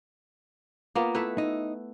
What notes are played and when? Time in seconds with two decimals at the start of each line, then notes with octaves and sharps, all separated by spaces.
0.95 A#3 B3 F4
1.15 A3 E4 B4
1.38 D#4